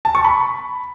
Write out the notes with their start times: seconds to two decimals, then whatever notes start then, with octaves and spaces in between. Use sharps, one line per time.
0.05 A5
0.15 C#6
0.24 B5